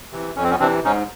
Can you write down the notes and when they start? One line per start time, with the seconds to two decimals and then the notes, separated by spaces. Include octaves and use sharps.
0.12 C3 E3
0.35 F2 C#4
0.43 C4
0.51 B3 C#4
0.60 C3 E3 C4 D4
0.84 G#2 C#4 D#4